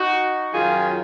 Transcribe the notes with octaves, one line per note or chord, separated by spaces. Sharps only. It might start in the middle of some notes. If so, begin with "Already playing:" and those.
Already playing: D#4 F#4
F#2 D#3 F#3 F4 G#4